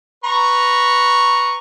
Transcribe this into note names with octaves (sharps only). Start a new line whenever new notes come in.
B4 A#5 C#6